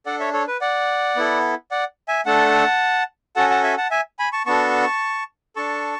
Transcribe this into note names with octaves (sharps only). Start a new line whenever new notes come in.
D4 A4 D5 F#5
C#5 E5
A4 C#5
B4
D5 F#5
B3 E4 A4
D5 F#5
E5 G#5
A3 D4 A4 F#5 A5
C#4 F#4 A4 F#5 A5
F#5 A5
E5 G#5
F#5 A5
E5 G#5
G#5 B5
A5 C#6
B3 D4 F#4 A4 A5 C#6
D4 A4 A5 C#6